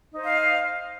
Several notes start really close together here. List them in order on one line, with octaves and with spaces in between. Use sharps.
D#4 C5 D#5 F5